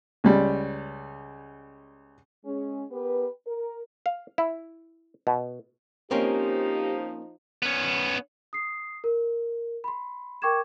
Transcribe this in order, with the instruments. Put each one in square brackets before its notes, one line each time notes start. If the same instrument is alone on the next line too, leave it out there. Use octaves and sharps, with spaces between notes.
[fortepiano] C#2 G3
[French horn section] G#3 C#4 G#4
B3 G4 A#4 B4
A#4
[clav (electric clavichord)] F5
E4
B2
[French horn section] F3 D#4 [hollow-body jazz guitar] A#3 C4 C#4 [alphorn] G4
[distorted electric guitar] B3 C#4
[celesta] D#6 C7
A#4
B5 C6
A#4 G5 C#6 D6 G#6 E7